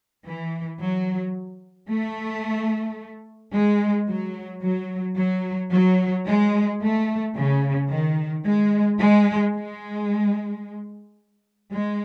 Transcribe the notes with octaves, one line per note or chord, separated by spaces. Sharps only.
E3
F#3
A3
G#3
F#3
F#3
F#3
F#3
G#3
A3
C#3
D#3
G#3
G#3
G#3
G#3